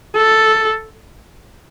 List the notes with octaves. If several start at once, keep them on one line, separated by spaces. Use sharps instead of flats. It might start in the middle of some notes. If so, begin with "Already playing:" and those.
A4